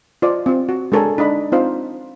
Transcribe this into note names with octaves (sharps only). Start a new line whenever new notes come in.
F4 C5 D5 D#5
C4 F4
F#4
G#3 D4 A4 A#4 C#5 G#5
D4 D#4 D#5 B5
C4 D#4 F4 C5 F5